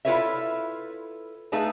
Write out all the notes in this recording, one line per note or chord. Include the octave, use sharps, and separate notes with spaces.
E4 F4 A4 B4 C#5 E5
A3 D#4 G#4 B4 F5 A5